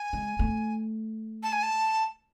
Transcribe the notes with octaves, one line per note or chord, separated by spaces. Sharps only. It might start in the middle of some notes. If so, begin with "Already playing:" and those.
Already playing: G#5
G#3
A3
A5
G#5
A5